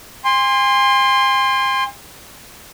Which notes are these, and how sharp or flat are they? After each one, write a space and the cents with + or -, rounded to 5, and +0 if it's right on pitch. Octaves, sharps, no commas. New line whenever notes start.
G#5 -45 C6 +5